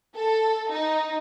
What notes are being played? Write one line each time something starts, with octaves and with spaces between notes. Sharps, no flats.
A4
D#4